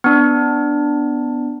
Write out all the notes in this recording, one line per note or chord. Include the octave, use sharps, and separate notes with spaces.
B3 D4